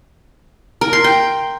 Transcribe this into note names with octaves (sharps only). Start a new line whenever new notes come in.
A#4
C6
G5